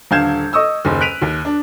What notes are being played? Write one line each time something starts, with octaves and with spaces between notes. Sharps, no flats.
D#1 D3 F5 G6 G#6 E7
D#5 C#6 D#6 E6
F#1 D#2
F#6 B6 D7 D#7 F7
D#2
D4